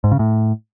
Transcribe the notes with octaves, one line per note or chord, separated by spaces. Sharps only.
G#2
C#3
A2